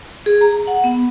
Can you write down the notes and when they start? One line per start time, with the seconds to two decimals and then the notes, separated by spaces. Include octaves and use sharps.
0.26 G#4
0.41 A#5
0.67 F#5
0.84 B3